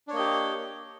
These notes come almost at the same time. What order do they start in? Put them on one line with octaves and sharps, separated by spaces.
D4 C#5 A#3 D#5 G4